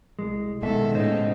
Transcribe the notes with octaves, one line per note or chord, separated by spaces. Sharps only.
C2 G#3
B1 C3 D#3 G#3 B3 A4 E5
A2 C#3 D#4 C5 D#5